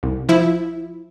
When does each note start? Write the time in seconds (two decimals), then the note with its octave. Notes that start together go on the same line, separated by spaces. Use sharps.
0.03 C2
0.29 F3 E4